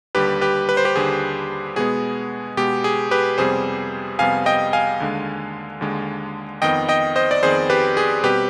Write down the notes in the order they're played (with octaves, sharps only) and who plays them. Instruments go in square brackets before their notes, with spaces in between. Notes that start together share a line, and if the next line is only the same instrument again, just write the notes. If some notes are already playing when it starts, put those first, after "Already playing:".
[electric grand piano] D#2 D3 G3 G4 B4
G4 B4
B4
C5
G4 B4
D#2 D3 G3 G#4
B2 G#3 B3 G#4
B2 G#3 B3 G4
G#4
G4 B4
F2 C3 G3 B3 G#4 C5
F2 C3 G3 B3 F5 G#5
D#5 G5
F5 G#5
D#2 D3 G#3
D#2 D3 G#3
F2 D#3 B3 D#5 G5
D#5 G5
C5 D#5
D5
F2 D#3 B3 G#4 C5
G4 B4
G#4
B2 G3 C4 G4 B4